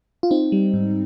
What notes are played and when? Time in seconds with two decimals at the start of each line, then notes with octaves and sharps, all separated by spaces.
0.23 F4
0.31 C4 D#4
0.52 G3
0.74 G#2